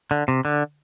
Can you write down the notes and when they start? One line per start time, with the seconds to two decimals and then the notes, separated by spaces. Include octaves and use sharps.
0.11 D3
0.28 C3
0.45 D3